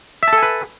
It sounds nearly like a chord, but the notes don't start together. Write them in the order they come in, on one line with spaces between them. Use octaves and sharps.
E5 A5 A4 G#5 B4